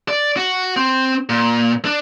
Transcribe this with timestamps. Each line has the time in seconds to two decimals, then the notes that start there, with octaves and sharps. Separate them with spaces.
0.08 D5
0.37 F#4
0.77 C4
1.29 A#2
1.85 D4